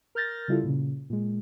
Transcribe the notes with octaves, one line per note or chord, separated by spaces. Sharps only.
A#4 F6 G6 A6 A#6
C#3 G3 E4 F4 A4
A#2 C#3
A#2 G#3